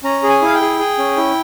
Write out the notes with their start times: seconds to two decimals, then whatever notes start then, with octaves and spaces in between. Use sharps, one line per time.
0.04 C#4 A#5
0.23 G#4
0.29 G#5
0.42 E4 F5
0.54 G5
0.61 G#4
0.79 G#4
0.98 C#4
1.17 E4